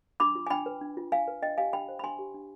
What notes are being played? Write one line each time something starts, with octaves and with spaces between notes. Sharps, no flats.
D4 B5 D6
F4
G#5
D4 G5 B5
B4
D4
F4
D4 F5 G#5
B4
D4 D#5 G5
G4 F5 G#5
D4 G5 B5
C5
B5
D4 G#5 C6
G4
D4